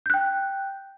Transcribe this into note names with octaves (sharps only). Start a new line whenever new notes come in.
G5 F#6 G6